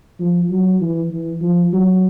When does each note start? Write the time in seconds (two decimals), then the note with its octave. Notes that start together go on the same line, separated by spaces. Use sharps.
0.19 F3
0.50 F#3
0.81 E3
1.11 E3
1.41 F3
1.73 F#3